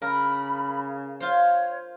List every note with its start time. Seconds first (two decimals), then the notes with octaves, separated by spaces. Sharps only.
0.02 C#3 A#4 B5
1.20 F4 C5 C#5